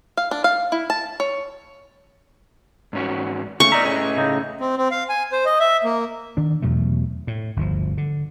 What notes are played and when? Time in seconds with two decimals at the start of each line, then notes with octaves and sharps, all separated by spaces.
0.17 F5
0.31 D4
0.44 F5
0.72 E4
0.90 A5
1.20 C#5
2.93 G#2 C#4 F#4
3.60 C#3 A3 C#4 C#6
3.72 D#4 A#4 D5 E5 A#5
3.85 A2 C#4 G#4 D#5
4.17 A2 C#3 D#4
4.61 C4
4.77 C4
4.91 F5
5.09 G#5
5.32 C5
5.45 D#5
5.60 E5
5.84 A#3
6.37 D#3 D4
6.62 E2 B2 F#3 A3
7.27 A2
7.57 G1 D2 B2 F3
7.98 D3